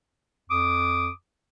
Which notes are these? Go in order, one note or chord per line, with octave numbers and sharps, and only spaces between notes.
F2 D6 D#6